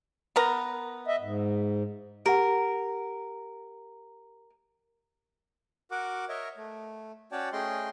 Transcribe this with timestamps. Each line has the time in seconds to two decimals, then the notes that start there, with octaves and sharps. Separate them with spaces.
0.36 B3 A#4 A#5
1.08 D#5 E5
1.21 G#2
2.26 G4 A#4 F#5
5.91 F#4 A#4 F#5 D6
6.29 A#4 C#5 D#5 E5
6.57 A3
7.32 C#4 F#4 C#5 D5 G5 A5
7.53 A3 C#4 G#4 D#5 G5 C6